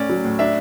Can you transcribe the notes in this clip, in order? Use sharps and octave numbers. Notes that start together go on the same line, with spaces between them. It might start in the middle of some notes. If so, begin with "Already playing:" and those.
Already playing: A2 C#4 D5
F#3
A2
D4 E5